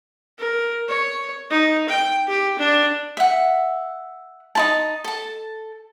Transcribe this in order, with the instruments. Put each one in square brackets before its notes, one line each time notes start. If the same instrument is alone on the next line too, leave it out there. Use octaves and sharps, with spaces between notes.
[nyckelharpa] A#4
C#5
D#4
G5
G4
D4
[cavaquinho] E5 F#5
D#4 E4 A5
A4 A5